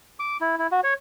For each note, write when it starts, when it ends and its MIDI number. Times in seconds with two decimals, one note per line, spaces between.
0.20 0.37 86
0.41 0.55 64
0.58 0.67 64
0.72 0.80 66
0.84 0.94 73